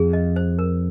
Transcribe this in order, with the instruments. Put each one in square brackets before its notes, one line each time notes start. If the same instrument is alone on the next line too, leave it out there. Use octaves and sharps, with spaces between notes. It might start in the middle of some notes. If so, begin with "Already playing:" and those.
Already playing: [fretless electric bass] F2 [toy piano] G#4
[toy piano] D#5
C5
A#4